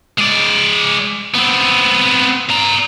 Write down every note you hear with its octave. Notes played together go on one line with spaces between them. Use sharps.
G#3 D5
B3 C4
D5 A#5